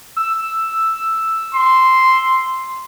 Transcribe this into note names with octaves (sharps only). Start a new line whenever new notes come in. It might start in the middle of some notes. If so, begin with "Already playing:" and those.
E6
C6